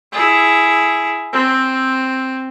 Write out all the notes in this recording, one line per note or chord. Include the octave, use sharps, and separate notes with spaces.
E4 G#4
C4